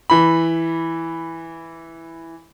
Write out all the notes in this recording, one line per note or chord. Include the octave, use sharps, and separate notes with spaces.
E3 B5